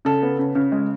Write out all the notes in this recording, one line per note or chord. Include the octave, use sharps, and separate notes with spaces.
C#3 A4
B3
C#3
C#3
G#3